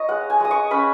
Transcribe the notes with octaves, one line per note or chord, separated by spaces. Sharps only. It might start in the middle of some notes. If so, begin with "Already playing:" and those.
Already playing: D#4 C#5 D#5
G#3 F#5
G#5
G#3 D#6
C#6
C#4 B5